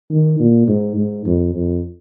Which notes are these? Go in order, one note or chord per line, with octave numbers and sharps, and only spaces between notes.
D#3
A#2
G#2
G#2
F2
F2